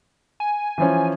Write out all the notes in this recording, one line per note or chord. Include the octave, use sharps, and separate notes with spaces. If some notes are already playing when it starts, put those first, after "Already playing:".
G#5
E3 F3 C#4